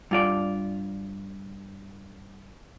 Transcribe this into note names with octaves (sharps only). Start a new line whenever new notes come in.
G2 F4 D5